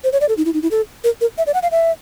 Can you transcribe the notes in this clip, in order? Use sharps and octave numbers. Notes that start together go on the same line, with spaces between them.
C5
C#5
D5
A4
D#4
E4
D#4
E4
A4
A#4
A#4
E5
D5
F#5
F5
E5